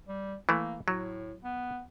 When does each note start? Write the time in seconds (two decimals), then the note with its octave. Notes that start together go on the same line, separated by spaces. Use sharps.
0.08 G3
0.49 E3 A3 A#3
0.88 A2 F#3
1.43 B3